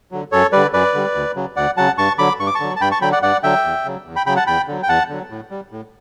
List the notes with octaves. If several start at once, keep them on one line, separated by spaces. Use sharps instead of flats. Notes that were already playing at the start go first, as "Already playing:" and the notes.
D3 F#3
F#2 A4 C#5
D3 G3 B4 D5
F#2 B4 D5
D3 G3
D2
C#3 F#3
D2 D5 F#5
C#3 F#3 F#5 A5
G2 A5 C#6
D3 F#3 B5 D6
G2 C#6
D6
A5 C#6
D3 F#3
A5
G2 G5 B5
A5 C#6
D3 F#3 G5 B5
D5 F#5
G2 D5 F#5
D3 F#3 E5 G5
E2
C#3 F#3
E2
G5 B5
C#3 F#3 G5 B5
F#5 A5
E2 G5 B5
D3 F#3
G5
E2 F#5 A5
D3 F#3
A2
G3
A2